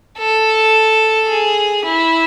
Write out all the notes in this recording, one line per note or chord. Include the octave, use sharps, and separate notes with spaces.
A4
G#4
E4